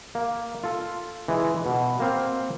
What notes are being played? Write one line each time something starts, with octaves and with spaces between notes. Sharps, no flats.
A#3
F4 A4
E3 G#3
B2
A#3 C4 F5